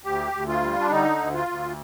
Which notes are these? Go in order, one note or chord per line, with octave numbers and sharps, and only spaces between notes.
D2 G4
D2
F4
G3
D4
D3 D#4
D2
F4
D2